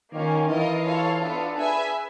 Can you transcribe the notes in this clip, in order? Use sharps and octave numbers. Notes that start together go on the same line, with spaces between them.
D#3 A#3 C#4 F4
E3 F4 A#4 D#5
F4 A4 C#5 F5
B3 D4 F4 A4
G#4 B4 E5 G#5